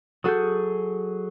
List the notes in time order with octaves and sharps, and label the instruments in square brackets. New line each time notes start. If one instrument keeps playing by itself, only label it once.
[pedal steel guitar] F#3 G#4 G6 [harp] F#4 A4 D#6